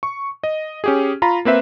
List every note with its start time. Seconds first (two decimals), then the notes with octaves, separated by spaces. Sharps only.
0.03 C#6
0.43 D#5
0.84 C#4 G4 G#4
1.22 F4 A#5 B5
1.45 A#3 C4 B4 E5